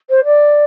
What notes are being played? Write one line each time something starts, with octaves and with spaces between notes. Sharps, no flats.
C5
D5